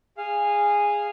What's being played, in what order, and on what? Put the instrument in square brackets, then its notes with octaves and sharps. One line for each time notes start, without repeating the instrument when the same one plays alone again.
[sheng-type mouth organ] G#4 F5